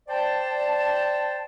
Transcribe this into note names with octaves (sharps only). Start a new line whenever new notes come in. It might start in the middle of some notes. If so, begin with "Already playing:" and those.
C5 D5 G5 A5